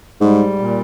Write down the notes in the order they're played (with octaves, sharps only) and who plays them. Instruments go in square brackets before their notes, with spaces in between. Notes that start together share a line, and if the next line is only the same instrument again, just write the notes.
[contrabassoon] G#2 [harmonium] G3
[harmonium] A#2